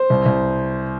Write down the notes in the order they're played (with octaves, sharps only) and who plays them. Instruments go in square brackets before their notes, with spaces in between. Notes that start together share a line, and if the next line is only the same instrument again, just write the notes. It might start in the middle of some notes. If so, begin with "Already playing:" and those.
Already playing: [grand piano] C5
C2
C2